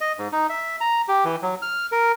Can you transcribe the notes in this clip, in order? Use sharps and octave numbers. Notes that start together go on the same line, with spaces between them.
D#5
G#2
D#4
E5
A#5
G4
E3
F#3
F6
A#4